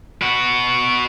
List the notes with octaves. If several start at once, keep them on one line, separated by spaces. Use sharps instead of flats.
F#4 B4